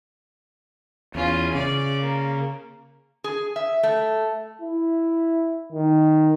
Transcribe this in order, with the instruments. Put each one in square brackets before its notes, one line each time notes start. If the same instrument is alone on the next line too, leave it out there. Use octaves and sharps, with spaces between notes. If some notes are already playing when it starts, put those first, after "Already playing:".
[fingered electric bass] E2 [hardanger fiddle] C#4 F4
[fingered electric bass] C#3 [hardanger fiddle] D5
[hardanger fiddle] A#3
[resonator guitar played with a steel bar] G#4
E5
A3
[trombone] E4
D#3